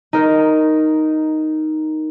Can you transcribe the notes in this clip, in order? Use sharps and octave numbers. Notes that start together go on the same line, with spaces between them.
D#4 A#4